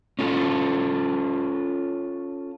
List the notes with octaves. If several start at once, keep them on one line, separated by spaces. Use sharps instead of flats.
C#4 F4 A4